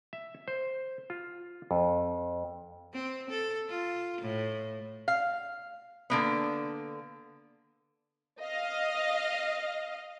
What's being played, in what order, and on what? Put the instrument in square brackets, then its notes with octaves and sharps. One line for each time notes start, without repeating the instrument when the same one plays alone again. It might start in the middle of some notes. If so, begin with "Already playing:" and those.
[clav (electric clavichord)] E5
C5
F4
F2
[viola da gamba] C4
A4
F4
A2
[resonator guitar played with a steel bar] F5
D3 A#3 B3
[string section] D#5 F5